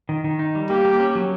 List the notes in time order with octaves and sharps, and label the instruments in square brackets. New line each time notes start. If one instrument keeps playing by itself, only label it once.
[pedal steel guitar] D#3
D#3
D#4
G3
[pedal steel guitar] A#3 [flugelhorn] G4
[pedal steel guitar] A#3
C#4
F#3